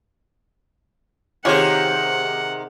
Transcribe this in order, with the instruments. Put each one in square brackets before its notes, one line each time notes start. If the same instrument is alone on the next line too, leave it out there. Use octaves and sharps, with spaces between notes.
[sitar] C3 D#3 G#4 [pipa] F4 G4 C#5 [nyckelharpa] F#5